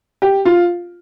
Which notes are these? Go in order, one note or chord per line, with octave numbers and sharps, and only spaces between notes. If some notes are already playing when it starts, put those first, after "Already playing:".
G4
F4